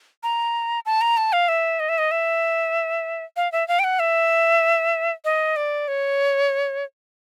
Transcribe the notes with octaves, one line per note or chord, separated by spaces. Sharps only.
A#5
A5
A#5
A5
F5
E5
D#5
E5
D#5
E5
F5
E5
F5
G5
F#5
E5
D#5
D5
C#5